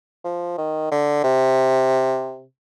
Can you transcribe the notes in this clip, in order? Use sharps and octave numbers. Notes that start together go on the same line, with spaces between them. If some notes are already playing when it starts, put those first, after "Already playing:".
F3
D#3
D3
C3